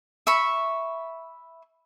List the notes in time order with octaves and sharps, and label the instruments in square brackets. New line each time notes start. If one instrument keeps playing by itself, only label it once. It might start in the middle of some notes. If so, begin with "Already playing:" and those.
[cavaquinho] E5 B5 C#6